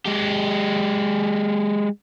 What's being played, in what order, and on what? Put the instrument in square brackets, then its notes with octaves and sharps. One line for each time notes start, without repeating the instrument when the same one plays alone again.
[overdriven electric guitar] G#3 G4